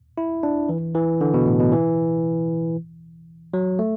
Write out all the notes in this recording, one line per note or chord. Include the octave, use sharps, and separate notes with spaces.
E4
D4
E3
E3
D3
B2
A2
B2
E3
F#3
A3